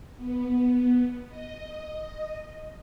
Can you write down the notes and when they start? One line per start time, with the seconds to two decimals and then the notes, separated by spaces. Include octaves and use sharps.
0.17 B3
1.29 D#5